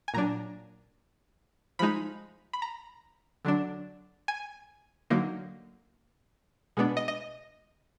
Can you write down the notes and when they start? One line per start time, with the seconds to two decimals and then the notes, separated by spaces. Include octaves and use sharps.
0.08 G#5
0.14 A#2 F#3 D4 A#5
1.79 F3 G#3 D#4 B5
2.53 B5
2.62 A#5
3.45 D3 F#3 D4
4.28 G#5
5.10 D3 F#3 A#3 D#4
6.77 B2 G#3 B3 D4
6.97 D#5
7.08 D#5